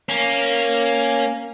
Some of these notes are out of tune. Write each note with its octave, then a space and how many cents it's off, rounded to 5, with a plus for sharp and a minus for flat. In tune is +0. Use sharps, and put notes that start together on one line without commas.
A#3 +0 C#4 +0